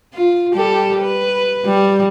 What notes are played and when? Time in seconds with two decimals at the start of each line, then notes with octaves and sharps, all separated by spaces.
0.14 F4
0.55 G3 G4 A4
1.01 B4
1.65 G3